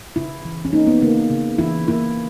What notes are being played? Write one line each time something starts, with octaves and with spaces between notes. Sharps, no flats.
C#3 E4
E3
C#4
A#3 D#4
B3
C#3 A#3
C#3
E3 E4
A#3 E4